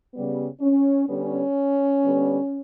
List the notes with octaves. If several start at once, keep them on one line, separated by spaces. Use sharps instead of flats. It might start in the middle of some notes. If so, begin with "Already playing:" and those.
C#3 G3 B3
C#4
D3 G3 B3 C#4
D3 G3 B3